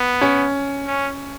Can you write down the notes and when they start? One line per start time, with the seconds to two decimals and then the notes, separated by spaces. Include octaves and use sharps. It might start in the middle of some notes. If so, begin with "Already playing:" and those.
Already playing: B3
0.21 C#4
0.87 C#4